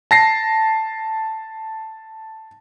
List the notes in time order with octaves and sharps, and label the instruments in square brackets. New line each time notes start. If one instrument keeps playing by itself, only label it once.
[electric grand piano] A5 A#6 C7